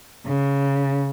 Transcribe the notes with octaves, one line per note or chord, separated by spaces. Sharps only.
C#3